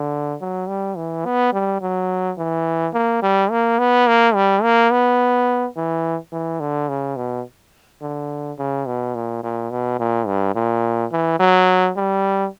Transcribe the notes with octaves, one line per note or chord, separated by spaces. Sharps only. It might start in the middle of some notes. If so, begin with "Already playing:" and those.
Already playing: D3
F#3
G3
E3
B3
G3
F#3
E3
A#3
G3
A#3
B3
A#3
G3
A#3
B3
E3
E3
D3
C#3
B2
D3
C#3
B2
A#2
A#2
B2
A#2
G2
A#2
E3
F#3
G3